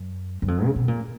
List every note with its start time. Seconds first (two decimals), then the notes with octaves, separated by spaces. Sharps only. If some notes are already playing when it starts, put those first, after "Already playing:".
Already playing: F#2
0.42 F#2
0.48 F2
0.65 C#3
0.76 B2
0.88 A#2